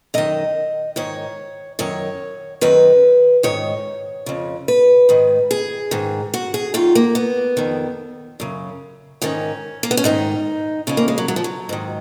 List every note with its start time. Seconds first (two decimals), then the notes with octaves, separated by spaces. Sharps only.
0.14 F#2 D#3 D#5
0.96 G#2 D#3 C#5
1.79 F#2 D#3 C#5
2.61 F#2 D#3 B4
3.43 G#2 D#3 C#5
4.26 F2 C#3
4.68 B4
5.09 G#2 D#3
5.51 G#4
5.91 G#2 D#3
6.34 F#4
6.54 G#4
6.74 F#2 D#3 F4
6.95 A#3
7.15 B3
7.57 F2 D#3
8.40 F#2 C#3
9.22 G#2 D#3 C#4
9.83 A#3
9.91 B3
9.97 C#4
10.04 G#2 D#3 D#4
10.87 F2 C#3 C#4
10.97 A#3
11.08 G#3
11.18 F#3
11.28 F#3
11.36 F3
11.44 F#3
11.69 G#2 D#3